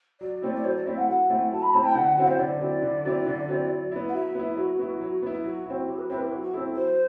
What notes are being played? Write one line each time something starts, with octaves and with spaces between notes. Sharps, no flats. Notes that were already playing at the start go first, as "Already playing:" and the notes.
F#3 D5
A3 C4 E4
D5
F#3 C5
D5
A3 C4 E4 E5
F#5
F#3 F#5
A3 C4 E4
F#3 A5
B5
A3 C4 E4 A5
G5
D3 F#5
F#3 C4 E4
C5
D3 D5
F#3 C4 E4
D3
F#3 C4 E4
D3
F#3 C4 E4
F#3
B3 E4
F#5
F#3 E5
B3 E4
F#3 F#4
B3 E4
F#3
B3 E4
F#3 F#4
C4 E4
F#3 G4
B4
C4 E4 B4
G4
F#3 F#4
F#4
C4 E4 A4
F#3 C5